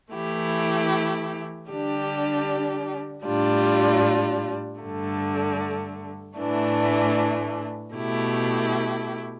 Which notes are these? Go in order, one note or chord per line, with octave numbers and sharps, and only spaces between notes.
E3 A3 E4 G4
D3 G3 D4 G4
A2 G3 D4 F4
G2 D3 A3
A2 E3 A3 D4
B2 A3 E4 G4